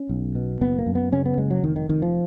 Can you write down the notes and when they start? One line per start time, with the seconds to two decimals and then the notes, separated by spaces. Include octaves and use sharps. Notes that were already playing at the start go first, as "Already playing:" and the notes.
Already playing: C#4
0.09 B1
0.35 B2
0.61 F#1 B3
0.79 A#3
0.86 F#2
0.95 B3
1.12 C#3 C#4
1.26 B3
1.38 F#1 G#3
1.51 F#3
1.63 F1 D#3
1.76 D#3
1.89 F1 D#3
2.02 F3